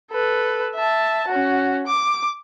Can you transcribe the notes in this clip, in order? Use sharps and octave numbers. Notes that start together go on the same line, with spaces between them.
A4 B4
E5 A5
C#4 F#4
D6